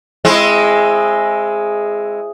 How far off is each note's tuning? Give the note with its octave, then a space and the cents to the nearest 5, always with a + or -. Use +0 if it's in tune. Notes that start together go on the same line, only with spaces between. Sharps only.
G#3 +0 C4 +20 E4 +25